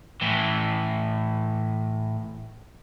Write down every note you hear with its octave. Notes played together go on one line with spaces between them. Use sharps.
A2 E3